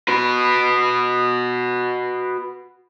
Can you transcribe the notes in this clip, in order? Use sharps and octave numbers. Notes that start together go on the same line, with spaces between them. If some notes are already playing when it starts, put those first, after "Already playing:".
F#4 B4